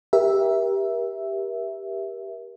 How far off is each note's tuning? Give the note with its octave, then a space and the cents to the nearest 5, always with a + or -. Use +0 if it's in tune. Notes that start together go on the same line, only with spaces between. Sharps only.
G4 +5 A#4 +30 E5 +0